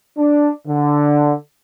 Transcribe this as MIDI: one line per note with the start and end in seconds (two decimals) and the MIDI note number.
0.18 0.50 62
0.67 1.34 50